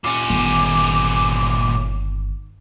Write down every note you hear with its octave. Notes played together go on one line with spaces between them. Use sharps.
A#2 C#4 D6
G1 D#3